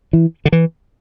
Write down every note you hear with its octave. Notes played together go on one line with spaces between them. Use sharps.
E3
D3
E3